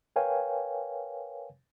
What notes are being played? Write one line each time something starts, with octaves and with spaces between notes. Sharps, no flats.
A#4 B4 C#5 F5 G5 G#5